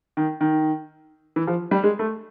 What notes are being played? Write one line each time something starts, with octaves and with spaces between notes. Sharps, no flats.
D#3
D#3
E3
F3
G3
G#3
A3